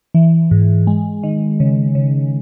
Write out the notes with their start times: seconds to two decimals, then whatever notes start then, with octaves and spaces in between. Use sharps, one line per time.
0.14 E3
0.51 G#2
0.87 G#3
1.23 D#3
1.60 C#3
1.95 C#3